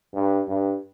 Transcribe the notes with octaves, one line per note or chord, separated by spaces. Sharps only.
G2
G2